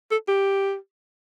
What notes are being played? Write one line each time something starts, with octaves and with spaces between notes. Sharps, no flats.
A4
G4